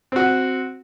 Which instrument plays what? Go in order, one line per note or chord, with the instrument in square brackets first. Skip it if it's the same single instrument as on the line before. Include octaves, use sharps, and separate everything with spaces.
[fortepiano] C4 F#4